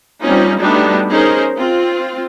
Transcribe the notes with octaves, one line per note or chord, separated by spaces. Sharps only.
G3 A#3 C4 C#4 D#4 F4
G3 A3 B3 D4 D#4 F#4
C#4 D#4 G#4 A#4 C5
C4 F4